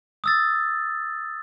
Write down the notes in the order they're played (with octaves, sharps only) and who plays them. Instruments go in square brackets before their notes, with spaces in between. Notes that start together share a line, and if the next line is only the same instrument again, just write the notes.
[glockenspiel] D#6 E6 A6